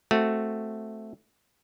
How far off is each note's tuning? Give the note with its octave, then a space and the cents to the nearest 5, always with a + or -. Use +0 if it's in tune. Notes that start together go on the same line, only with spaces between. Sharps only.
A3 +0 C4 +0 F#4 +0